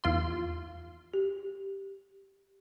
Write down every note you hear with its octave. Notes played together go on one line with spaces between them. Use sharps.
E2 F4 C6
G4